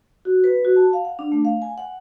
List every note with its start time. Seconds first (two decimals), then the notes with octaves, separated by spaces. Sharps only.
0.25 F#4
0.44 B4
0.65 F#4
0.76 A5
0.93 F5
1.05 F#5
1.19 D4
1.32 A3
1.45 F5
1.62 G#5
1.78 F#5